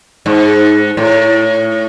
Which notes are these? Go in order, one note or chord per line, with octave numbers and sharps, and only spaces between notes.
G#2
A2